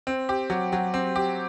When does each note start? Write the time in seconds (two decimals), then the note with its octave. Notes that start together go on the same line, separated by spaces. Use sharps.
0.07 C4
0.29 G4
0.50 F#3
0.73 F#3
0.94 C4
1.16 G4